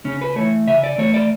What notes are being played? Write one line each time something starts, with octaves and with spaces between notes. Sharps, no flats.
C#3 C#4
B4
E3 A3 C#5
C#3 E5
D5
E3 A3 C#5
D5